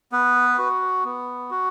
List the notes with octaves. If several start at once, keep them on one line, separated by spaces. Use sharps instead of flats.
B3 B4
F#4
B3
F#4